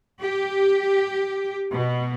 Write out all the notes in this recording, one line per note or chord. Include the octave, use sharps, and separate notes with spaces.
G4
B2